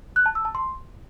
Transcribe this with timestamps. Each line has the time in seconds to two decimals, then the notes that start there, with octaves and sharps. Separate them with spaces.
0.16 F#6
0.26 A5
0.35 E6
0.45 A5
0.55 C6